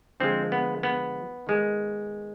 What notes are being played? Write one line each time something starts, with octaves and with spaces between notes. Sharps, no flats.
D3 F3 G#3 C4
B3
B3
D#3 G#3